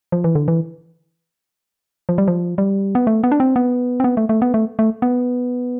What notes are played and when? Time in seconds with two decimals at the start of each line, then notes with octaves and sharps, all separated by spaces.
0.12 F3
0.24 E3
0.35 D3
0.48 E3
2.09 F3
2.18 G3
2.28 F3
2.58 G3
2.95 B3
3.07 A3
3.24 B3
3.32 D4
3.40 C4
3.56 B3
4.00 C4
4.04 B3
4.17 A3
4.29 A3
4.42 B3
4.54 A3
4.79 A3
5.02 B3